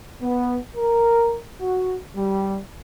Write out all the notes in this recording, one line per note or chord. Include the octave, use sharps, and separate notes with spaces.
B3
A#4
F#4
G3